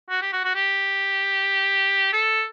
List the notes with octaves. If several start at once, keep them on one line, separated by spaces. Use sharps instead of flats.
F#4
G4
F#4
F#4
G4
A4